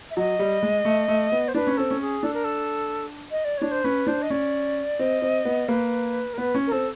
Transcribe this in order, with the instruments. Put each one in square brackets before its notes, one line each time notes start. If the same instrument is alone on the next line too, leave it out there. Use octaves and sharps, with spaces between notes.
[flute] E5
[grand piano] F#3 [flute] D#5
[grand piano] G3
G#3
A3
A3
B3
[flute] C5
[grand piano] D4 [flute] B4
[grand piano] C#4
[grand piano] C4 [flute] A4
[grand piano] C#4
[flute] G#4
[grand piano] D4 [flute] A4
[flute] A#4
A4
D#5
D5
[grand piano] D4 [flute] C#5
[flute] C5
[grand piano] C#4 [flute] B4
[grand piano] D4 [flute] C5
[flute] D#5
[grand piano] C#4 [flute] D5
[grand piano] C4 [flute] D#5
[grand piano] C4
B3
[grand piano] A#3 [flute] B4
[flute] A#4
[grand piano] B3 [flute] B4
[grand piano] C#4
[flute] A#4
[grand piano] C4 [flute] A4